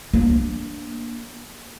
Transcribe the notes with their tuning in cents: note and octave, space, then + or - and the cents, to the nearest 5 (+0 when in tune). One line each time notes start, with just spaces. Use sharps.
A#3 +15 D4 +0